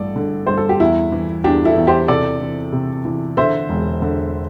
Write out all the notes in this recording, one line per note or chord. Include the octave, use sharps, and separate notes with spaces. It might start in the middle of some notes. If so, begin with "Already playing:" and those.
Already playing: A1 G2 A4 D5
D3
G2 C5
A4
G4
E2 E4
E3
E2 D4 G4
E4 A4
E2
G4 C5
C3 A4 D5
E3
C3
E3
D3 C5 E5
E1
D3